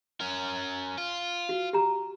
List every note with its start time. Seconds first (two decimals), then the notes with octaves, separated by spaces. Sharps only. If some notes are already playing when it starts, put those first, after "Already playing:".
0.21 C#4 A#4
0.98 F4
1.49 F#4
1.73 G4 A#5